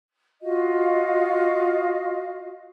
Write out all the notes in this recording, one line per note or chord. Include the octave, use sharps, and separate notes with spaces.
F4 F#4 D#5 F5